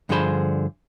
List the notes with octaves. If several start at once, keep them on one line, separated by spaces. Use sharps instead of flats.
G2 D3 F3 G#4 C5 B5